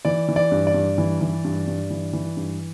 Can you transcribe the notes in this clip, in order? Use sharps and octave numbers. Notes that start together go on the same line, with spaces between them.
E3 D5
E3
D5
G2
D5
G2
E3
E3
G2
G2
E3
E3
G2